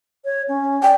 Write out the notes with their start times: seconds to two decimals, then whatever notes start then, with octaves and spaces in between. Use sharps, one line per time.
0.25 C#5
0.48 C#4
0.83 D5 G5